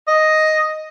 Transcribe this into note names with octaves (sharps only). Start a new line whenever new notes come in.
D#5